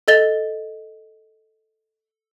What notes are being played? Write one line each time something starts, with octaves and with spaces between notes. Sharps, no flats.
A4 D#5 A6 G7